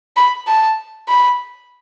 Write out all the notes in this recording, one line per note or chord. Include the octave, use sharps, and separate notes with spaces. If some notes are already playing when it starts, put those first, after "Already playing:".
B5
A5
B5